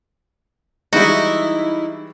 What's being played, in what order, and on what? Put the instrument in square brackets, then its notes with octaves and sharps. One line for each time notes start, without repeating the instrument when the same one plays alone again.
[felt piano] E3 G3 G#3 [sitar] D#4 E4 [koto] F#4